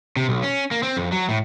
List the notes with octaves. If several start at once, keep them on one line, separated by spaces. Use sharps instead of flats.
C3
B1
C#4
A#3
C4
F2
F#3
A2